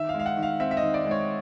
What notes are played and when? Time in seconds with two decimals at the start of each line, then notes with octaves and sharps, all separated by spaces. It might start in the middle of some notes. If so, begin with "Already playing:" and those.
Already playing: D#3 E5
0.09 F5
0.14 G#3
0.19 F5
0.26 F#5
0.37 D#3
0.43 F5
0.60 C4 E5
0.71 E5
0.77 D#5
0.83 D#3
0.94 D5
1.05 G#3
1.11 C#5